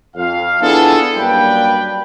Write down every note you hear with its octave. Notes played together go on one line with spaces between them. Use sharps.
F2 F5
B3 D4 E4 F4 G#4 A4
F#2 G3 A#3 D4 B4 G5